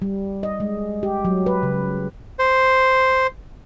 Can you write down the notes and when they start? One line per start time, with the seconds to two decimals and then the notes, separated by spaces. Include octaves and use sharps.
0.02 G3
0.43 D#5
0.60 G#3
1.03 G4
1.25 F#3
1.46 B4
1.63 C#3
2.39 C5